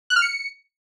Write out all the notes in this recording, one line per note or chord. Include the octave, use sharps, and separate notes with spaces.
F#6
F6
C#7